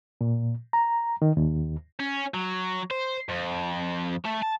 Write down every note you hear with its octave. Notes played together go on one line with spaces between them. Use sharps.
A#2
A#5
D#3
D#2
C#4
F#3
C5
F2
A3
A5